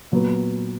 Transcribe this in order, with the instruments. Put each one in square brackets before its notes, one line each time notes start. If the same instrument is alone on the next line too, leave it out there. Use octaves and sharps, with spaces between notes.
[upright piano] A#2 F#3 B3